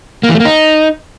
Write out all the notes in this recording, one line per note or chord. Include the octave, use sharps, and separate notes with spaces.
A#3
E3
A3
A#3
D#4